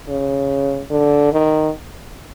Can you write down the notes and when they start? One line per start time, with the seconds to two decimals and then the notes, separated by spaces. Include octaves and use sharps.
0.08 C#3
0.91 D3
1.32 D#3